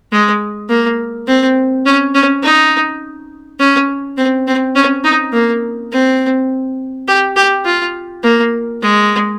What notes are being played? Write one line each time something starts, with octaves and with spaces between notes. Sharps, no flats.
G#3
A#3
C4
C#4
C#4
D#4
C#4
C4
C4
C#4
D#4
A#3
C4
G4
G4
F4
A#3
G#3